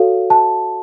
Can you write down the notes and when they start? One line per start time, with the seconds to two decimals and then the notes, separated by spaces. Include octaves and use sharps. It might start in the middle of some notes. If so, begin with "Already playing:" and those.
Already playing: F#4 A4 C#5 F5
0.30 A5